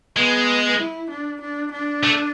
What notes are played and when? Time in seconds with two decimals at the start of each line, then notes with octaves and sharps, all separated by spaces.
0.16 G#3 B3
0.78 E4
1.10 D4
1.41 D4
1.71 D4
2.04 A3